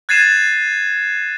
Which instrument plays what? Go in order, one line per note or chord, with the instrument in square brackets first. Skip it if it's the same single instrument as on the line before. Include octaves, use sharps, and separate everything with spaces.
[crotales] F#6 G#6 A6 C7 D#7 E7